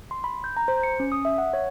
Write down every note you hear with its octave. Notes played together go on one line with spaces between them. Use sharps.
C6
B5
G6
A#5
C5
C#7
C#4
D#6
E5
F#5
C#5